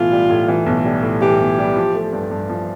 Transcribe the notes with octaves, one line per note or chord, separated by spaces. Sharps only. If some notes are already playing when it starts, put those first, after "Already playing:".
Already playing: B1 A2 E3 F4
G3
A2
E3
B1
G3
A2
E3 G4
B1
G3
F3
A3
G2
G2
F3